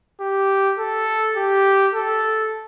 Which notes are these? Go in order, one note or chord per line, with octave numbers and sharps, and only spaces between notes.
G4
A4
G4
A4